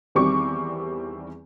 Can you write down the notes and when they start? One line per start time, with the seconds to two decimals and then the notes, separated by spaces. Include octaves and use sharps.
0.15 E2 D#3 G3 C4 C#6 D6